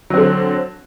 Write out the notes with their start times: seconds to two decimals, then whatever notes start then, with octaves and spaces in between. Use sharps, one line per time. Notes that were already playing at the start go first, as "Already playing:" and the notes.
0.10 F#3
0.14 C4
0.17 D3